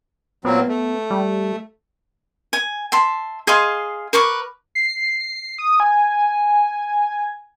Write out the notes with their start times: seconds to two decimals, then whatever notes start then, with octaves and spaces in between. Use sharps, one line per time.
0.45 A#2 F#3 B3 C4
0.69 A3
1.11 G3
2.53 G#5
2.92 E5 A5 C6
3.47 G#4 D#5 F5 C6
4.13 A#4 B4 C#6 D6
4.75 C7
5.58 D#6
5.80 G#5